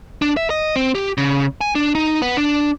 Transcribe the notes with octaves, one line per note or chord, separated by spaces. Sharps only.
D4
E5
D#5
C4
G4
C#3
G#5
D4
D#4
B3
D4